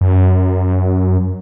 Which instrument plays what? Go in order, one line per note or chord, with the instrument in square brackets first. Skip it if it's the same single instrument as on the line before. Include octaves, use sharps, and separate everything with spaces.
[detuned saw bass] F#2